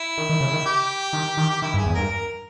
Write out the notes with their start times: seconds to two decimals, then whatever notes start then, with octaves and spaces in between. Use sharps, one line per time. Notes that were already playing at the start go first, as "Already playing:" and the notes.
Already playing: E4
0.18 D#3
0.29 D#3
0.41 C#3
0.53 D#3
0.65 G4
1.13 D#3
1.37 D#3
1.50 G4
1.62 D#3 E4
1.74 G2
1.78 G#4
1.86 E2
1.94 G2 A#4
2.09 A#4